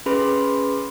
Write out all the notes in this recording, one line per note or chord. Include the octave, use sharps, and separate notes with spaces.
C#4 G#4 B4 B5 C6